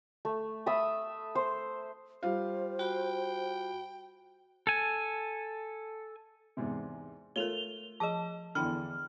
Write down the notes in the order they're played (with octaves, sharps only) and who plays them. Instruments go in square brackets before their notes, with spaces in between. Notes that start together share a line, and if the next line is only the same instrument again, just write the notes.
[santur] A3
E5 A5 B5 D#6
C5
[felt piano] G3 F4 F5 [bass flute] C5
[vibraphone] F#4 B5 [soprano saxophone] G5
[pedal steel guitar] A4 G#5
[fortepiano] E2 G#2 C3
[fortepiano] A3 F4 [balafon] A#4 C#5 [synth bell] F7 G7
[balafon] F3 G#4 [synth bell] D#5 A5
[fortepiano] E2 D3 [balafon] E4 G5 B5 [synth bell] F6